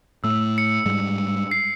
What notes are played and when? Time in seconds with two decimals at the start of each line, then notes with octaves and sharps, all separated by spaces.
0.24 A2 A3 E6
0.58 C#7
0.85 G#2 G3 G#3
1.51 C7